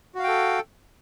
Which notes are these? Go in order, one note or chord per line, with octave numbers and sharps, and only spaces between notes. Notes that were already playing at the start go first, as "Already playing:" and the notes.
F#4 A4 F5 G5